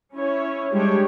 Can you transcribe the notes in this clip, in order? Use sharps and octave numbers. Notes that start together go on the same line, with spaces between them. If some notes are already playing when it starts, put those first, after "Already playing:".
C#4 E4 C#5
G3 G#3 D4 G4 C#5